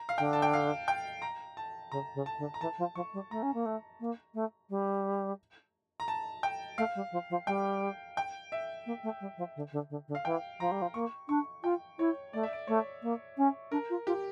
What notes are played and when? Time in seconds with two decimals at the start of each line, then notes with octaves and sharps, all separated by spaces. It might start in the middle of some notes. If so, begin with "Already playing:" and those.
Already playing: A#5
0.09 F5
0.18 D3 G5
0.33 A5
0.42 G5
0.54 F5
0.88 G5
1.22 A#5
1.57 A5
1.92 C#3 A#5
2.15 C#3
2.26 A5
2.38 D3
2.54 A#5
2.61 E3 A5
2.78 F3
2.95 F3 C#6
3.14 G3
3.31 A3 A#5
3.43 C#4
3.54 A#3
3.66 A3
4.00 A#3
4.34 A3
4.70 G3
6.00 A#5
6.08 A5
6.43 G5
6.78 A3 F5
6.95 G3
7.12 F3
7.30 F3
7.47 G3 G5
8.17 G5
8.52 E5
8.86 A#3
9.03 A3
9.21 G3
9.38 F3
9.56 D3
9.72 D3
9.90 D3
10.08 D3
10.15 F5
10.25 E3 G5
10.60 F3 A#5
10.71 G3
10.82 F3
10.94 A#3 C#6
11.29 D4 C#6
11.64 F4 G5
11.99 E4 C#5
12.33 A3 D5
12.43 E5
12.53 D5
12.67 A3 C#5
13.03 A#3
13.37 C#4
13.72 D4 A#4
13.90 F4
14.07 F4 G4